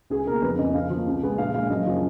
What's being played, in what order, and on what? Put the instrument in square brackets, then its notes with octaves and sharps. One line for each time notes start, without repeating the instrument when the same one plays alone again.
[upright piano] C#2 G#4
B2 A#4
A#3
F1 B4
F2 C#3 D#5
F2 F5
F3 A#3
C#2
B2 G#3 B3
A#1 F5
A#2 G#3 F5
F#1 D#5
C#3 F3